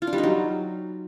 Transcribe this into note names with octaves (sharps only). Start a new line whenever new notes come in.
F4
D4
G3
D#4
F#3